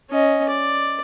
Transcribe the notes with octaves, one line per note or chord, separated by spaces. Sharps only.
C#4 D#5
D5